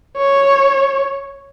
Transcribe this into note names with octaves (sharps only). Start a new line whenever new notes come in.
C#5